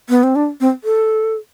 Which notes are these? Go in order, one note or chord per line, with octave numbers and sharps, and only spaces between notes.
B3
C4
D4
C4
A4